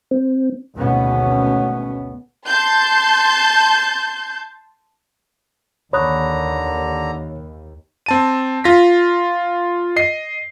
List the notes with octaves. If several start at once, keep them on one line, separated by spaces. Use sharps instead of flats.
C4
G#1 D2 B2 B3 C#4
A5 C6 G6
D#2 D3 C#5 A#5 B5 D#6 F#6
C4 A5 D#7
F4 A#6 B6
D#5 C7